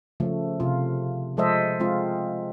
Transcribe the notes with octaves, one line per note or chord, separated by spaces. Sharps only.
C#3 F3 A3
C3 F4
F3 G#3 A4 C5 D#5 E5
G#3 C4 F4